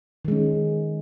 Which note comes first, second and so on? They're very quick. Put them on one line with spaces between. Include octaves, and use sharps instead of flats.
D#3 G#3 C#4